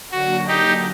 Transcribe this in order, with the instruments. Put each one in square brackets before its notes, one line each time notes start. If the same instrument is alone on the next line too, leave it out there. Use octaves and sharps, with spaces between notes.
[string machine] D3 F#3 A#3 D4 [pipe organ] F#4
[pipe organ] D#4 G4